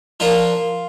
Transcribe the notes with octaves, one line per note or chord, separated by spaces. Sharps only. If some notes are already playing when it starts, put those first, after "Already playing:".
F3 A#3 D4 F4